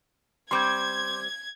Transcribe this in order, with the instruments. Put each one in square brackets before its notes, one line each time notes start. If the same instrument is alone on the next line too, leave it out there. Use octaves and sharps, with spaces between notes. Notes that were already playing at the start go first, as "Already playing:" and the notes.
[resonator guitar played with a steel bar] G3 C4 [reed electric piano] C6 D6 G6 [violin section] G#6